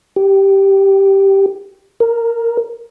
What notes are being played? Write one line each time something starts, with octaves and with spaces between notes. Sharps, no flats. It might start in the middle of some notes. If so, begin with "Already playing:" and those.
G4
A#4